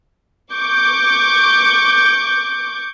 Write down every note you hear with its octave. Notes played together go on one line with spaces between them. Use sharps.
C#6 D6 G6